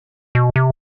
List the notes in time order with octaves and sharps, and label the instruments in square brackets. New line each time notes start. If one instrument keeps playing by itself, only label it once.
[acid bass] B2
C3